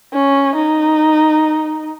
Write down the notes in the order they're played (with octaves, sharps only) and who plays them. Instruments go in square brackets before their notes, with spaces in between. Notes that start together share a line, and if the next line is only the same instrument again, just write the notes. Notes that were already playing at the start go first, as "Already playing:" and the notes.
[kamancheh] C#4
D#4